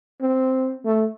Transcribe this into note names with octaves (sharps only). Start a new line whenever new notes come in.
C4
A3